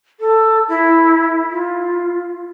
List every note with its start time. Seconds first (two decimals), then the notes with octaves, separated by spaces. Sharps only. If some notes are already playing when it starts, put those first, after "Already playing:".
0.20 A4
0.69 E4
1.50 F4